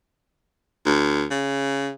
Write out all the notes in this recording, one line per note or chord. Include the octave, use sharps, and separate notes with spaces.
D2
C#3